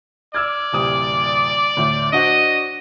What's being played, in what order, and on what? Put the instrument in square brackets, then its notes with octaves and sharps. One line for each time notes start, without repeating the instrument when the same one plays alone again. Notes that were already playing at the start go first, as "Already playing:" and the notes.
[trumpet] D5 [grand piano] E6 F6 G#6
[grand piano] D1 C3 D#6
D2 A2
[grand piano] D4 F#4 C5 [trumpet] D#5